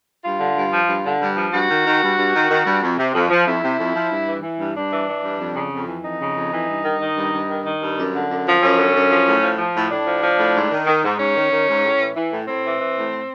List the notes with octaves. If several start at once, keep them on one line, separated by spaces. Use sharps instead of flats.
G2 F4
D3
G2
F3
G2
D3
G2
F3
G2 F#4
D#3
D#3
G2
G2
D#3
D#3
G2
F2
C3
F2
F3
F2 E4
C3
F2
F3
G2
E3
E3
G2
G2 D4
E3
E3
G2
F2
C#3
F2
E3
F2 D#4
C#3
F2
E3
G2
D#3
D#3
G2
G2
D#3
D#3
G2
F#2
D3
F#2
F3
F#2 C#4
D3
F#2
F3
A2
F3
F3
A2
A2 D4
F3
F3
A2
G#2
D#3
D#3
G#2
G#2 C#4
D#3
D#3
G#2
A2
E3
E3
A2
A2 C4
E3
E3
A2